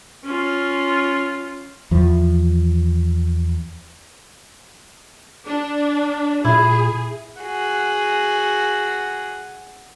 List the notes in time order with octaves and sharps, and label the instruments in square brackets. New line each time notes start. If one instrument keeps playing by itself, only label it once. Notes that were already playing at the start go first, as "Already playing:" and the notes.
[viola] C#4 F4
[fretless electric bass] E2 F3
[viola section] D4
[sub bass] A#2 [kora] E4 [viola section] G#4
[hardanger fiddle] F#4 G#4